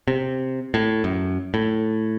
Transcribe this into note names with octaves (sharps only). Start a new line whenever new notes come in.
C3
A2
F#2
A2